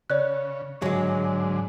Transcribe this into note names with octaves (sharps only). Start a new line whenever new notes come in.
C#3 C#5 D5 F#6
G#2 D3 F#3 G#3